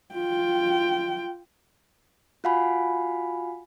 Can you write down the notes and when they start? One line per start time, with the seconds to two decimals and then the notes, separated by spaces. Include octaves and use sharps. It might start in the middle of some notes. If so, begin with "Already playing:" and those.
0.14 F4 G5
2.44 F4 F#4 F5 F#5 G#5 B5